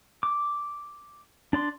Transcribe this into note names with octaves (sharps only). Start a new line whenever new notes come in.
D6
D4 D5 C6